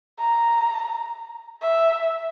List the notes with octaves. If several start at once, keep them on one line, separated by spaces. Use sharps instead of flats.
A#5
E5